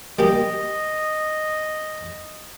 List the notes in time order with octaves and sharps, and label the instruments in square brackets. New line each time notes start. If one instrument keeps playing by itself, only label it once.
[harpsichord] G3 A#3 G4 [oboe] D#5